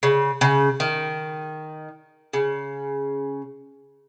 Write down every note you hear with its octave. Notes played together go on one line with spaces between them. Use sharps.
C#3
C#3
D#3
C#3